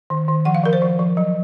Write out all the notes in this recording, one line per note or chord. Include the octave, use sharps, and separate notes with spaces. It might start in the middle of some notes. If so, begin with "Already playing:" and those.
D#3
D#3
F3 F#5
F5
F3 A#4
C5
F3
F3
F#3